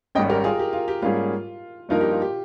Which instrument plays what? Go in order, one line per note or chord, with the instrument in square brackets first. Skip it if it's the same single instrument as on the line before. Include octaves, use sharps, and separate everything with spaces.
[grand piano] G#1 G#2 G3 C#4 [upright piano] D#5 G5
[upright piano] G4 A#4
F4 G#4
G4
F4
G4
[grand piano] G#2 G3 A#3 C#4 G#4 [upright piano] F4
[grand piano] G2 F3 A#3 D#4 A#4 [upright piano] F4
[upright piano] G4
F4
G4